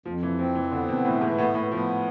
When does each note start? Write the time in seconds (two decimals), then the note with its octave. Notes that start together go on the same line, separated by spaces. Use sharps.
0.05 F2 F3
0.23 E3
0.39 F3 C4
0.55 E3
0.71 D3 B3
0.88 B2
1.04 A2 E3
1.21 G#2
1.38 A2 B3
1.55 A2
1.71 F3 B3